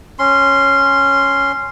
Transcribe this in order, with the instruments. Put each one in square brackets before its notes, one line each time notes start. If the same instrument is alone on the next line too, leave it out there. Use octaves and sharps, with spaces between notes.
[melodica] C#4 C6